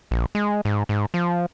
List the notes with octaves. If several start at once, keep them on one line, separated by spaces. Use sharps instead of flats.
A#1
G#3
G#2
G#2
F3